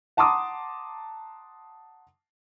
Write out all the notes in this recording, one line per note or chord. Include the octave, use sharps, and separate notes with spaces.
F#5 A5 A#5 C6 D6 D#6